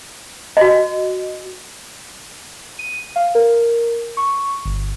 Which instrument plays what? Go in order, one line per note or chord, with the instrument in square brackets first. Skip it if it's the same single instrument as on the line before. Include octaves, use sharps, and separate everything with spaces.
[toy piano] F#4 D#5
[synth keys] D#7
F5
A#4
C#6
G1